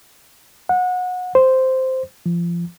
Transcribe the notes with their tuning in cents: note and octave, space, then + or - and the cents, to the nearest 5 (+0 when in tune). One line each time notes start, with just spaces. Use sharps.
F#5 -25
C5 -5
F3 -25